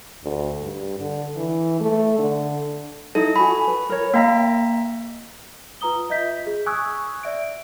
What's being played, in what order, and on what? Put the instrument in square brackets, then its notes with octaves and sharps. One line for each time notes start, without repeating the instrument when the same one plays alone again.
[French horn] D2
G2
D3
E3
A3
D3
[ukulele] D#4 E4 [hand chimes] A4
[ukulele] F#4 G#5 [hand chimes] B5
[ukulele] B4
A#4 C#5
[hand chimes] A#3 A#5 B6 [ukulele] D#5 F5 G5
[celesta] F4 B4 A#5 D#6 G7
F4 D#5 E5 G6 B6
G#4
G#5 C#6 D#6 E6 F#6 G#6
D5 E5 D7